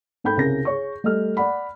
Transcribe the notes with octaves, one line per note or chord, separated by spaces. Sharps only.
G#2 A4 G5 B5 G6
C2 C#3 G#4 A#4 A#6
G#4 C#5 C#6
G3 A3 A4 D#5 F6
D5 F#5 B5